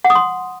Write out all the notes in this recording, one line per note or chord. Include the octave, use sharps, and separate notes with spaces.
F#5
D#6
C6